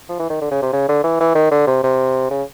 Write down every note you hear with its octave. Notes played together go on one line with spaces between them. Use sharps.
F3
E3
D#3
D3
C#3
C3
C#3
D3
E3
E3
D#3
D3
C3
C3
C#3